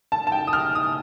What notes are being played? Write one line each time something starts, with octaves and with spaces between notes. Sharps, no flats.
A5
A5
G5
D#6
F6
D#6